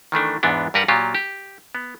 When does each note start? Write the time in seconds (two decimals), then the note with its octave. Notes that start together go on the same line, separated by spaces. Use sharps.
0.12 D#3 E3 A3 D4
0.43 E2 G#2 E3 B3 D4
0.74 G2 G3 A#4 B4 F#5
0.88 A#2 F#3 F4 G4
1.15 G4
1.75 B3